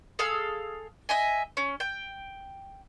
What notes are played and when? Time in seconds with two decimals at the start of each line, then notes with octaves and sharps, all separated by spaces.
0.19 G#4 A4 F5 E6
1.09 D#5 E5 G#5
1.57 C#4
1.80 G5